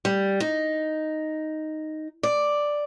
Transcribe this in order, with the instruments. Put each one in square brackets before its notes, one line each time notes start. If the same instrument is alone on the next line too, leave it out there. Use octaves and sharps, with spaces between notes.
[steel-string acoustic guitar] G3
D#4
D5